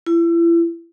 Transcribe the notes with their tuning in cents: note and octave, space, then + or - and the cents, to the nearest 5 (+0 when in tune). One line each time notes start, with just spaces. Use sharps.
E4 +35